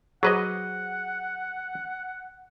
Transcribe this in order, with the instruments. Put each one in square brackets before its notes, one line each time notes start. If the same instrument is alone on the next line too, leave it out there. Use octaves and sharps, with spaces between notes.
[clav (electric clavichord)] F#3 B4 D#5 [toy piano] G#4 C5 [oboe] F#5